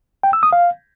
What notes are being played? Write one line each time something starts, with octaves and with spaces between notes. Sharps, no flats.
G5
E6
D#6
F5